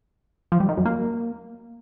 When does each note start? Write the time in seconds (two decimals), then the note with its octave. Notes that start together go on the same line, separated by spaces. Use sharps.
0.52 F3
0.60 G3
0.69 D#3
0.77 F#2
0.85 A#3